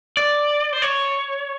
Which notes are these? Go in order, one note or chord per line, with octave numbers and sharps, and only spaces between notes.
D5
C5
C#5